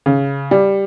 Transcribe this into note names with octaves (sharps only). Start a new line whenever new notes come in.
C#3
G3